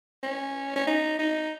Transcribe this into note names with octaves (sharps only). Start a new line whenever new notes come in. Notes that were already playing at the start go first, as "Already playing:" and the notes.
C#4
C#4
D#4
D#4